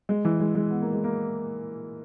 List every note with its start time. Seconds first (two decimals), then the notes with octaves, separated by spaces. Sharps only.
0.09 G#3
0.25 E3
0.40 G#3
0.55 G#3
0.71 B3
0.82 A#3
0.93 G#3
1.04 A#3